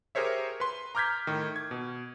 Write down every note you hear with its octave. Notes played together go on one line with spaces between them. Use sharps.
G4 G#4 A#4 C5 C#5 E5
B4 C6
A#5 D6 F6 G6 G#6 B6
A2 D#3
G#6
B2